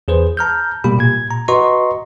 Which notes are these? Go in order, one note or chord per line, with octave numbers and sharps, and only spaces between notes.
E2 G#4 B4 C5
A5 A#5 F6 G6
B2 G3 A#3 G4 B5
A#2 G#6
A#5
F#4 B4 D#5 A#5 C6 C#6